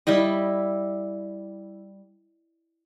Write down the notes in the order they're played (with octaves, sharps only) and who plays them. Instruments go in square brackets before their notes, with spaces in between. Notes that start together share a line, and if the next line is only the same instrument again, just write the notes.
[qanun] G3 E4 G4 D#5